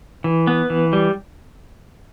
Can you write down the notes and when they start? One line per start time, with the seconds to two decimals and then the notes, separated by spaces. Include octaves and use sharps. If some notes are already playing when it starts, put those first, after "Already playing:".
0.24 E3
0.47 B3
0.70 E3
0.93 G3